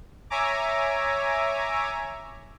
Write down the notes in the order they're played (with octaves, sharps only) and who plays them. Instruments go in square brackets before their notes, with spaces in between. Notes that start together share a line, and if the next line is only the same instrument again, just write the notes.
[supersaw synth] C#5 E5 G#5 A#5 D6